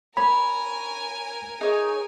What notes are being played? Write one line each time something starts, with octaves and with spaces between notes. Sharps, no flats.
A#4 C#5 G#5 B5
D#4 G#4 C#5